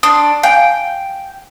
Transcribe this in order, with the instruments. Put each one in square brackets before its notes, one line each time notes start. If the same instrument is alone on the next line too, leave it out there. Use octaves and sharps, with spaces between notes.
[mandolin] D4 C6 [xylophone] D#6
[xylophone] F5 G#5 [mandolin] G5